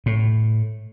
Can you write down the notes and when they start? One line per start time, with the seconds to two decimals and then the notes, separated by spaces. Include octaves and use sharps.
0.06 A2